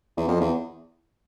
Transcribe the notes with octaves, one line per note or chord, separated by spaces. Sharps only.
E2
F2
E2